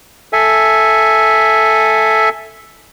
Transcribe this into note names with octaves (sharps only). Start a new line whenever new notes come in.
A4 E5 G#5